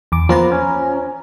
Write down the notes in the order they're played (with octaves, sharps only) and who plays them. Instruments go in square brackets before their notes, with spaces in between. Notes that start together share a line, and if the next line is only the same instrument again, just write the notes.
[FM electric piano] E2 D6
[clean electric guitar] F3 A#3 B3 [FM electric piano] F4 C5 A#5
[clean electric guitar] C#4